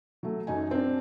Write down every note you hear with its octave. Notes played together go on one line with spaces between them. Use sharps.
F#3 A3
F#2 D#4 G#5
C4 D4